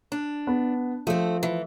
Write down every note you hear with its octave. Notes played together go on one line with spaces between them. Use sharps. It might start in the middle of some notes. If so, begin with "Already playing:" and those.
D4
B3
F3 A3 C4
E3